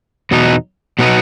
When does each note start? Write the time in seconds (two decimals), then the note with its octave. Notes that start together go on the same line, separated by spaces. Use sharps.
0.31 E2 B2 F#3 B3 D#4
0.99 B2 F#3 B3 D#4